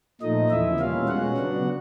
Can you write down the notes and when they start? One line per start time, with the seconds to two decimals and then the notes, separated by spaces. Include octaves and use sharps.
0.21 A#2 F3 A3 D#4 D#5
0.50 E2 C#3 F3 E4 E5
0.80 B2 G3 A#3 C#4 F4 F5
1.08 B2 G#3 C#4 F#4 F#5
1.37 C#3 F#3 B3 D4